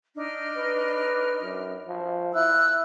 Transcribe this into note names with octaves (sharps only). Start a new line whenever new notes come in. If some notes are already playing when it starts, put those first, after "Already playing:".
D4 D#4 F6
B4
F#2
F3
E4 E6 F#6